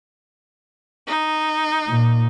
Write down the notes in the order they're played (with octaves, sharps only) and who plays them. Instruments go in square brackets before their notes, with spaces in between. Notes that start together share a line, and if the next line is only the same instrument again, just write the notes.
[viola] D#4
[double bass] A#2